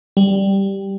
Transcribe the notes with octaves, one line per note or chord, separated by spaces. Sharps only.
G3